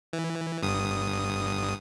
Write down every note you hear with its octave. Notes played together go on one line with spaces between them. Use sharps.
E3
G1 G2 D#6